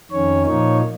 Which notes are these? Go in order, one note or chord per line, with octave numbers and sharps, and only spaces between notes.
F2 D#3 C#4 C#5
A#2 F3 A#3 D#4 C#5